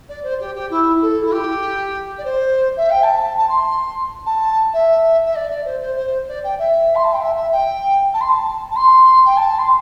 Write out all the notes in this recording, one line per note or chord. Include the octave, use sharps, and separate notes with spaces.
D5
C5
G4
G4
E4
A4
E4
G4
D5
C5
E5
G5
A5
A5
C6
A5
E5
E5
D5
D5
C5
C5
C5
D5
G5
E5
C6
A5
G5
E5
E5
G5
A5
C6
A5
A5
C6
G5
A5
C6